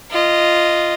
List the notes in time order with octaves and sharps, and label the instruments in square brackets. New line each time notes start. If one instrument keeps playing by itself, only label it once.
[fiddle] F4 D#5